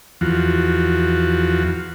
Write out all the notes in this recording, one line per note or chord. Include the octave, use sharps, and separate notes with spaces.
E2 F3 F#4